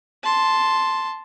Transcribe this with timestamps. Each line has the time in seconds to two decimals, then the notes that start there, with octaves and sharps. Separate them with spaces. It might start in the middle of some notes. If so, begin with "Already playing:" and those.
0.24 A5 C6